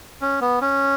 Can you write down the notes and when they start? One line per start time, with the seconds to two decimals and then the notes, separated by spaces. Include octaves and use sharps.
0.22 C#4
0.41 B3
0.62 C#4